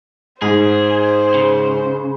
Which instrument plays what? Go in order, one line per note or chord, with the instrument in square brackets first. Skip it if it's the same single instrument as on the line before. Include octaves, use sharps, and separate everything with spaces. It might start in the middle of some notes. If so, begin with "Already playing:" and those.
[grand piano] G#2 [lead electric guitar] G#4 [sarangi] C5
[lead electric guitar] C#3